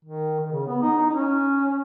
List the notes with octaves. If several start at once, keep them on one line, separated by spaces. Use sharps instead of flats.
D#3
D#3
C#3
B3
D#4
D#4
D#4
C#4